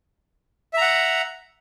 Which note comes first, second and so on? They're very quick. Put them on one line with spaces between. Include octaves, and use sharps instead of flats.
E5 A#5 F#5